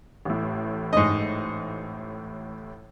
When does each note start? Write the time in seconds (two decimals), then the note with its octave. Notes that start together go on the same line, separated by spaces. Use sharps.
0.25 A1 A2
0.93 G#2 D#5